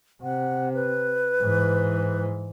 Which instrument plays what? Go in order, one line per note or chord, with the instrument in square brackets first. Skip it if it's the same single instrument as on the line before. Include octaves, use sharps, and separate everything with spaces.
[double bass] C3 [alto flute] F#5
[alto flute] B4
[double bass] G#2 E3